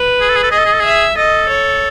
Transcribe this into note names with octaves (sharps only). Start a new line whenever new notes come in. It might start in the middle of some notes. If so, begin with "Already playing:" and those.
Already playing: B4
G#4
A4
G#4
A4
G#4 D#5
A4
G#4
A4
G#4 E5
A4 D#5
C#5